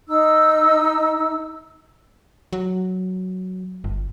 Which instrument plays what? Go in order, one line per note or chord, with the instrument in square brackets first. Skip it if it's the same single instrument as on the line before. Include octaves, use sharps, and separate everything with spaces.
[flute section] D#4 E6
[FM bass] F#3
G1